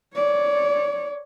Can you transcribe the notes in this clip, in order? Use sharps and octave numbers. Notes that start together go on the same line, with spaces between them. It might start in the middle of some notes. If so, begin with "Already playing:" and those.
C#5 D5